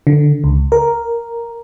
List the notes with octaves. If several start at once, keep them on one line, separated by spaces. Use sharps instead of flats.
D3
C#2
A#4